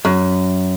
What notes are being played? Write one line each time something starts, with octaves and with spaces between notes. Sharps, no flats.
F#2